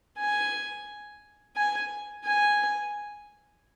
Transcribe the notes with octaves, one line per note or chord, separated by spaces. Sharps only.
G#5
G#5
G#5